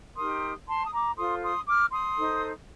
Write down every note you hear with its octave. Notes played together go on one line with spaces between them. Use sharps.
D#4 G4 A#4 C6 D#6
A5 C6
D#6
A#5 D6
F4 A4 C5 C6 D#6
C6 D#6
D6 F6
C6 D#6
D#4 A4 C5